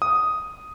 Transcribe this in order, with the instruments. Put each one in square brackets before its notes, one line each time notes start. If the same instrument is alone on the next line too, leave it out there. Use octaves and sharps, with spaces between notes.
[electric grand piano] D#6